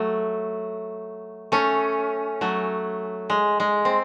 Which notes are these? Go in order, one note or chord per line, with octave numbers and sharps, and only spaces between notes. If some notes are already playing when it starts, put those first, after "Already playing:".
Already playing: F#3 A3
A3 C#4
F#3 A3
G#3
G#3
C4